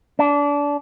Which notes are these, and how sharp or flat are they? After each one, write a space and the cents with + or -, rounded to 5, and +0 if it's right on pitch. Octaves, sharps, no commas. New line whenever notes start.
D4 -25